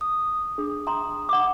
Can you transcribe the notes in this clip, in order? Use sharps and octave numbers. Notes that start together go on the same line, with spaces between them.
D#6
D4 G#4
G5 A#5 C6 D#6
F#5 D6